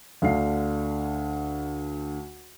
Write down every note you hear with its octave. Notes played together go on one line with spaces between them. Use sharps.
D2 D3 F5 C7